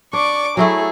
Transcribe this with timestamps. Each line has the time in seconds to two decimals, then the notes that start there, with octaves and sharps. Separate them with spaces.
0.13 D4 D5 C#6 D6
0.57 F#3 A3 E4 G#4 A4